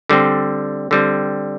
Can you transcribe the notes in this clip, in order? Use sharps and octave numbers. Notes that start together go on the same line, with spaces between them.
D3 G3 C4
D3 G3 C4